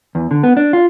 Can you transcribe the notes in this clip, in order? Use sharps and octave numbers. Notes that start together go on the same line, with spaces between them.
E2
D3
B3
D4
F4